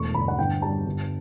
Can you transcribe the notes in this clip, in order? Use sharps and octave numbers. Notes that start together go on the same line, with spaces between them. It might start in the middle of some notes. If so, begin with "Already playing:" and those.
Already playing: E1 A3 C#6
G1 B5
F#5
G1 G5
G3 A5
G1